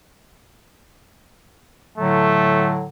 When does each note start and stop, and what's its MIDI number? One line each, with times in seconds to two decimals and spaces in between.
1.98 2.86 45
1.98 2.86 50
1.98 2.86 54
1.98 2.73 57